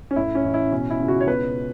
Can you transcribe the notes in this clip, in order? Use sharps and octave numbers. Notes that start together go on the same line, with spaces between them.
C#4
A2 E4
C#4
A1
E4
B2 C#4
E4
C#2
F#4
C#5
B2 B4